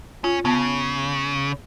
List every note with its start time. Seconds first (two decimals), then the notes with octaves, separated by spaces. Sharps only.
0.24 C#4 F4
0.45 C#3 B3 A5